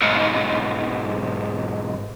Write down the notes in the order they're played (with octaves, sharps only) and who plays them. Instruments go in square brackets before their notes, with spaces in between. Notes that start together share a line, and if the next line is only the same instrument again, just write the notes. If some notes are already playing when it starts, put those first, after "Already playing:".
[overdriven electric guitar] B1 G#2